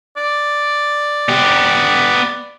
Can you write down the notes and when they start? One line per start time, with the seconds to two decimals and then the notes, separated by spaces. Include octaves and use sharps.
0.17 D5
1.29 B3 G4